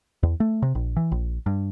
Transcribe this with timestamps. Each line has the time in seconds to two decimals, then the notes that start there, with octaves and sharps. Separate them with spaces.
0.23 E2
0.40 A3
0.62 C3
0.75 A#1
0.97 E3
1.12 A#1
1.46 G2